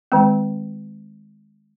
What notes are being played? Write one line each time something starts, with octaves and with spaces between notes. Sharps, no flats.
D#3 G#3 C4